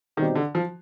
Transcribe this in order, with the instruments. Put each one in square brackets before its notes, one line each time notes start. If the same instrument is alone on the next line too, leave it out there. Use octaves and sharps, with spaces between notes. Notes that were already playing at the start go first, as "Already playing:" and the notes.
[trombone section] B2 G3 C4 D#4 G4 [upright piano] D#3
[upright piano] D3
F3